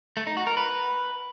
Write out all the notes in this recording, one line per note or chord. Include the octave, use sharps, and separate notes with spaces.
A3
D#4
F#4
A#4
B4